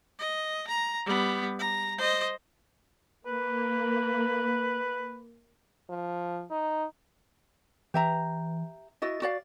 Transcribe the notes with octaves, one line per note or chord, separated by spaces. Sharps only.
D#5
A#5
G3 B3
A#5
C5 D#5
A#3 B4
F3
D#4
E3 G4 E5 A#5
E4 F#4 D#5 A6
F#4 D5 F5